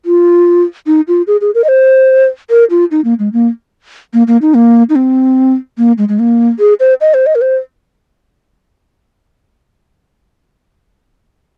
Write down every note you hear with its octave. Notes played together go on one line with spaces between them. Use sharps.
F4
D#4
F4
G#4
G#4
A#4
D#5
C5
A#4
F4
D#4
A#3
G#3
A#3
A#3
A#3
D#4
A#3
D#4
C4
A#3
G#3
G#3
A#3
G#4
C5
D#5
C5
D#5
A#4
C5